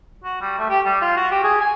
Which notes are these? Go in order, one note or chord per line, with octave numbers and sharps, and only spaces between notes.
F#4
G3
A3
G4
G3
F4
F#4
G4
G#4
G#5